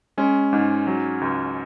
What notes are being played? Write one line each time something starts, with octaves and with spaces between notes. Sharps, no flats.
G#3 C#4
G#2
F#3
C#2